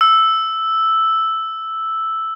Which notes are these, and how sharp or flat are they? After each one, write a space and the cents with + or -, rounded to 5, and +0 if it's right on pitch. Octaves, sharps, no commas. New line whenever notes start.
E6 -5